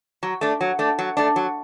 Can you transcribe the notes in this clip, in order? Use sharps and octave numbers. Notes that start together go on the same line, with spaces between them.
F#3
A3 D4
F#3
A3 D4
F#3
A3 D4
F#3